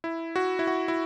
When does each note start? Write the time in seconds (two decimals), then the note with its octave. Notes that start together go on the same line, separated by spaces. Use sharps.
0.04 E4
0.36 F#4
0.59 E4
0.67 F#4
0.88 E4